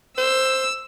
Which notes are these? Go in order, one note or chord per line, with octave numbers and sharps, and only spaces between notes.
C5 E6